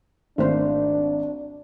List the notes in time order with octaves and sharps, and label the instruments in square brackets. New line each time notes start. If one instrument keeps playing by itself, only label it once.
[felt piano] G#1 [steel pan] A3 A#3 C5 [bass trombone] D4